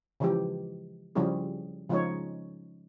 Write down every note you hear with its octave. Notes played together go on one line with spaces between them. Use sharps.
C#3 E3 F3 G#3 G4
C#3 F3 G3 C#4 E4 G#4
C#3 F3 G#3 C#4 D#4 C#5